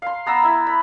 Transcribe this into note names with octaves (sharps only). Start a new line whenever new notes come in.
F5 C6
B3 A#5 E6
E4 E5
B5